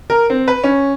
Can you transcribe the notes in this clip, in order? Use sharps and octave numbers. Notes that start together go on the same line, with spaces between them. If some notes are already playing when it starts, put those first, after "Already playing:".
A#4
C4
B4
C#4